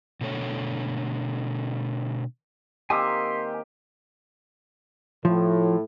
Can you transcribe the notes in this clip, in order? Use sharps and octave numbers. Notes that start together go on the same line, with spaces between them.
B2 D3 A3 C#5
D#3 A#3 C4 G4 G#5 C6 D#6 E6
A2 F3